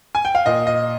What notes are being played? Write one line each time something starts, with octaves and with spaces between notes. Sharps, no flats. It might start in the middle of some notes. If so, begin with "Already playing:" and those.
G#5
G5
F5
A#2 D#5
D#5